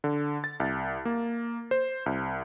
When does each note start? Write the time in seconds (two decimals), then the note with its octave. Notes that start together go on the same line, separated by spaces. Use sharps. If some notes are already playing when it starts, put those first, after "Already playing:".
0.04 D3
0.44 A6
0.60 C2
1.05 A#3
1.71 C5
2.06 C2